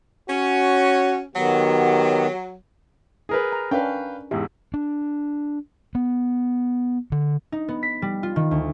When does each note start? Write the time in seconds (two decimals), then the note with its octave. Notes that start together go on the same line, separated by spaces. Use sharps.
0.30 C#4 F#4
1.36 D#3 F#3 B3 G4
3.29 G#4 A#4 B4
3.53 A#5
3.71 C#4 D4 A#4 B4 F5 G5
4.31 E2 G#2 G4 E5
4.74 D4
5.95 B3
7.12 D3
7.52 D#4
7.68 B3
7.83 B6
8.02 G3
8.23 F4
8.36 D#3
8.51 D2